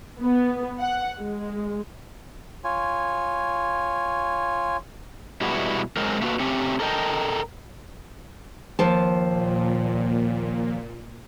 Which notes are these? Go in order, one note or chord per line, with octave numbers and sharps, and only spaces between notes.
B3
F#5
G#3
F4 C#5 G#5
B2 G3 G#3 B3 E4 F#4
F#3 G#3 C4 A#4
A3 A#3 F4 F#4 B4
A3 C4 C#4 G4
A4 A#4 D#5 G5
D#2 F3 A5
A#2